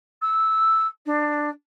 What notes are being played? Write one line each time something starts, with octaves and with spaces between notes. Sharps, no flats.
E6
D4